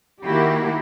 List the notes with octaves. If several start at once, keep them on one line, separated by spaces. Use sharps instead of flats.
D#3 A#3 E4 F#4 G4